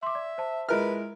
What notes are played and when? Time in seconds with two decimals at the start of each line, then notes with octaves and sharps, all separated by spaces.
0.03 E5 C6 D6
0.15 D5
0.38 C5 A5
0.69 G#3 E4 F4 A#4 B4 E5 F6